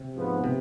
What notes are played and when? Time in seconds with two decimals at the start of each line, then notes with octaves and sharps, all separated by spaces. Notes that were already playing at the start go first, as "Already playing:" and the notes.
Already playing: C3
0.15 G#2 F3 B3
0.44 C3